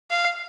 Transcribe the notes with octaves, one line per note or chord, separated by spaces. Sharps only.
F5